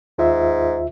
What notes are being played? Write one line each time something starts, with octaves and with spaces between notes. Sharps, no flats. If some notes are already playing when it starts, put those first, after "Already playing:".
D#2 G#2 F4 E5